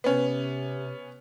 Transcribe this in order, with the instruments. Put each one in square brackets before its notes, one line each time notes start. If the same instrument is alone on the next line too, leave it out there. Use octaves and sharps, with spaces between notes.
[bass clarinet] C3 [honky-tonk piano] B3 C#4